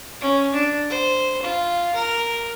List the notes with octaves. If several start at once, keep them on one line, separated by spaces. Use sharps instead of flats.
C#4
D4
C5
F4
A#4